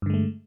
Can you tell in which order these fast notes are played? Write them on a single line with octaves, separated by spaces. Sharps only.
G2 D3 G#3 A3